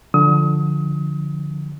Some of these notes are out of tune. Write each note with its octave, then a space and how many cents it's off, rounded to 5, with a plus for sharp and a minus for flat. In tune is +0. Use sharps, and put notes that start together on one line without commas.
D3 +0 F3 +0 D#6 +35